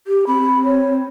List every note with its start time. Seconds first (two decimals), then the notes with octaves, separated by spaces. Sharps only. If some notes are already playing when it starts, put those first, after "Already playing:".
0.07 G4
0.27 C4 B5
0.65 C#5